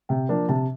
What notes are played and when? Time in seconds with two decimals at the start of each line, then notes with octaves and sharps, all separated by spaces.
0.09 C3 G5
0.29 F3 A#3 D4
0.49 C3 A5